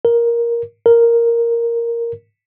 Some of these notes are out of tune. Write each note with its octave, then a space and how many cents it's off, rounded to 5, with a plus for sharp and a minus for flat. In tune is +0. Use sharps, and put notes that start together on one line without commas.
A#4 +10
A#4 +0